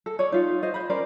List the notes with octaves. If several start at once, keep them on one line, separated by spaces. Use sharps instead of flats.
A4
C#5 D5
D#4 F4
C5 D#5
C5 B5
C#4 A#4 C5 D5